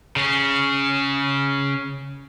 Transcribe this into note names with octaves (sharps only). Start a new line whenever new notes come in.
C#3 C#4